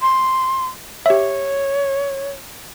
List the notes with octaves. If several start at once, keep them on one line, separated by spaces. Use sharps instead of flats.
C6
G4 C#5 E5